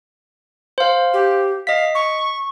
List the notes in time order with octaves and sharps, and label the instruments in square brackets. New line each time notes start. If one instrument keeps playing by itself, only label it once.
[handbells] C5 F5
[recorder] G4
[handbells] D#5 B6 [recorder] F5
[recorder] C#6